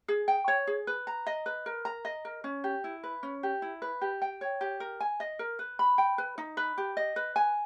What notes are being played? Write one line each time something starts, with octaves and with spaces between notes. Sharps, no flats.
G#4
G5
C#5
G#4
B4
A#5
D#5
B4
A#4
A#5
D#5
A#4
C#4
G4
E4
B4
C#4
G4
E4
B4
G4
G5
C#5
G4
A#4
G#5
D#5
A#4
B4
B5
G5
B4
D#4
B4
G4
D#5
B4
G#5